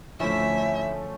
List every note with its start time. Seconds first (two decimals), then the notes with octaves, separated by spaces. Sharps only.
0.20 D2 D3 F3 A3 C#4 E4 E5